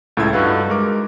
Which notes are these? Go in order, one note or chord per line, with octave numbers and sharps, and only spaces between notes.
C#2 A2 A4 E5 G#6
G2 D#4 F#4 A4 B4 F5
G#3 A#4 D6